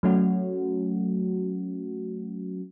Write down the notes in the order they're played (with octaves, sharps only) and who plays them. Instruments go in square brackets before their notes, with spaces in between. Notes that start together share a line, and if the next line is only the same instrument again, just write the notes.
[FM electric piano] F#3 A3 C#4 F#4